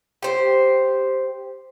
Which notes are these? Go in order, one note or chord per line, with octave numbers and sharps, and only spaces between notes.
G4 C5